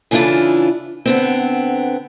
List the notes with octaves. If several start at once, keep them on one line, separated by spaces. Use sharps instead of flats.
C#3 E3 D4 E4 F4 A4
D3 B3 C4